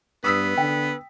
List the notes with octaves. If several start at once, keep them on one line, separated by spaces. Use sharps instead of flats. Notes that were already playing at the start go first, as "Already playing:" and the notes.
G2 B3 D#6 E6 B6
D3 G5